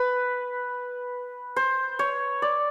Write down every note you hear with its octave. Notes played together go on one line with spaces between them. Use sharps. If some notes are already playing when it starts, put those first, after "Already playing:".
Already playing: B4
C5
C#5
D5